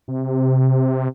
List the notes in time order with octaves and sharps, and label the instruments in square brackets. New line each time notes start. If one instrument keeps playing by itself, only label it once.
[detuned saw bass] C3